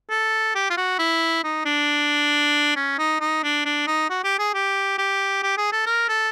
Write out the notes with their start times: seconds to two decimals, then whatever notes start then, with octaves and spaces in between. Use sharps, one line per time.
0.10 A4
0.55 G4
0.70 F4
0.77 F#4
0.99 E4
1.44 D#4
1.65 D4
2.76 C#4
2.98 D#4
3.21 D#4
3.43 D4
3.65 D4
3.87 D#4
4.10 F#4
4.24 G4
4.39 G#4
4.54 G4
4.98 G4
5.43 G4
5.57 G#4
5.72 A4
5.87 A#4
6.09 A4